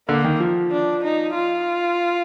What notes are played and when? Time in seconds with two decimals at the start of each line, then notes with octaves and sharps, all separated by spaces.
0.09 D3 A#3
0.24 D#3
0.40 F3
0.71 D4
1.04 D#4
1.34 F4